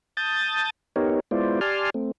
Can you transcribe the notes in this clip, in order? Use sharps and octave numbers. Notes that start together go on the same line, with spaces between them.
A5 D#6 G6 A6
B3 D#4 G4 A#4 C#5
G#3 B3 E4 F4 C5 D5
G4 D5 G#5 A5 C6 F6
A3 C4